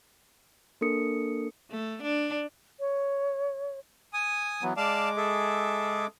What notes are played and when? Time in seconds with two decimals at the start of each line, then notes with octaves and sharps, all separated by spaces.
0.81 A#3 D4 A4 A#4 D#6 C#7
1.71 A3
2.02 D4
2.80 C#5
4.13 G#5 D#6
4.63 E3 F#3 B3
4.77 G#3 D5 F5 A5 D6
5.17 G#4 A4 E5